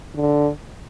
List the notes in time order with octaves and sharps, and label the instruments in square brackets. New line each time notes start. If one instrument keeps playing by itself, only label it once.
[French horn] D3